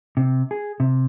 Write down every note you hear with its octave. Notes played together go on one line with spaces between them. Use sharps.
C3
G#4
C3